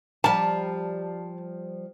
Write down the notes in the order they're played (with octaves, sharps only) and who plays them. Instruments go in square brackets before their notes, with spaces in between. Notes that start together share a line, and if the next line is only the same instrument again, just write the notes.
[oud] F3 G3 [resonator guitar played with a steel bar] A5